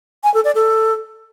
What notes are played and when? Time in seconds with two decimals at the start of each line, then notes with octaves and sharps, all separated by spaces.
0.24 G#5
0.34 A4
0.45 D5
0.55 A4